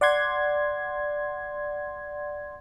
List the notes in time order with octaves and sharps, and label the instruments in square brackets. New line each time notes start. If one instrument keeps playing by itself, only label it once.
[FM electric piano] D5 F#5 C6 G#6